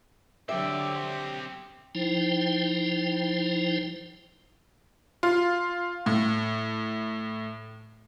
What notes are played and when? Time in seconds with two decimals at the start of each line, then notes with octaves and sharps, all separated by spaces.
0.49 D3 F#3 C4 G4 D5 E5
1.95 F3 D#4 E4 C5 G5
5.23 F4
6.06 A2